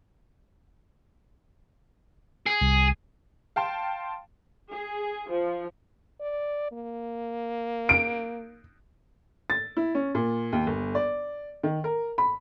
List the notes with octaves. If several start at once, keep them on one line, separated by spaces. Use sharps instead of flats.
G#4
C2
F5 G5 A5 C6
G#4
F3
D5
A#3
D7
A6
E4
C#4
A#2
D#2
G1
D5
D#3
A#4
B5